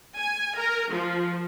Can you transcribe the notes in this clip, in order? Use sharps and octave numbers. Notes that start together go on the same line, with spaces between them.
G#5
A#4
F3